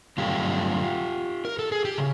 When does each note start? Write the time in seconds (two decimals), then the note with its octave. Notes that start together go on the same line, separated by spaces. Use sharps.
0.18 G2 D3 F#3 A3 C4 F4 G4
1.45 A#4
1.59 A4
1.72 G#4
1.85 G4
1.98 C#3